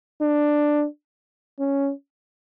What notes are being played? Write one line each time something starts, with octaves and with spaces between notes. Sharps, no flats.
D4
C#4